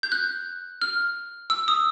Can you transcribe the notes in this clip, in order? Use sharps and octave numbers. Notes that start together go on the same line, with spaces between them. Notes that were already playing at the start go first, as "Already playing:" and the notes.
G6
F#6
F6
E6
D#6